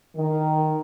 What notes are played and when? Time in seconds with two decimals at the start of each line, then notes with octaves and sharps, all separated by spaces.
0.16 D#3